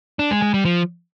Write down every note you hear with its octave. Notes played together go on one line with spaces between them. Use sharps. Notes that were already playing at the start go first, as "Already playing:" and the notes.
D4
G#3
G#3
G3
F3